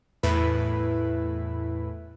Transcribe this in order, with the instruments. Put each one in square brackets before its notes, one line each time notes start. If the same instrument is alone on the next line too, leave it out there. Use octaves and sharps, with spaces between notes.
[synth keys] E2 A2 E4 B4 B5